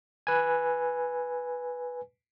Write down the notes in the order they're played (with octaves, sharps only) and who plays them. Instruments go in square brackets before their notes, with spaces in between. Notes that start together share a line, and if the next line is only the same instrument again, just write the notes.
[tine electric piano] B4 G#5